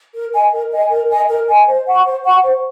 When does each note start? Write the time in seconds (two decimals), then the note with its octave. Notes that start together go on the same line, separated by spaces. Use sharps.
0.14 A#4
0.33 D#5 G#5
0.52 A#4
0.71 D#5 G#5
0.90 A#4
1.10 D#5 G#5
1.29 A#4
1.47 D#5 G#5
1.67 C5
1.86 F#5 C#6
2.05 C5
2.24 F#5 C#6
2.43 C5